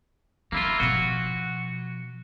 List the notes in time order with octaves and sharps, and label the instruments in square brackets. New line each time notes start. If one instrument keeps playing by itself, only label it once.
[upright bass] D3 [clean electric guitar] A#3 E4 F4
[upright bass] B2 F3 [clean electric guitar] F#4